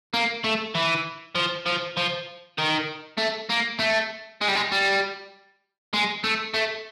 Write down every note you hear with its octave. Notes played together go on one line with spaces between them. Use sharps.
A#3
A3
E3
F3
F3
F3
D#3
A3
A#3
A3
G#3
G3
G#3
G3
G#3
A3
A3